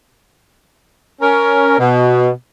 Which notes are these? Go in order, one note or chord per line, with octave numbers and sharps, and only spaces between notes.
C#4 A#4
B2